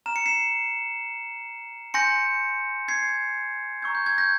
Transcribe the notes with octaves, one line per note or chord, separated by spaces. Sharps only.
A#5 F6 E7
C#7
C7 E7
G#5 C6 G6 A#6 C#7
G#6 C7
A#5 C#6 E6 G6 G#6
G6
G#6
G6 A#6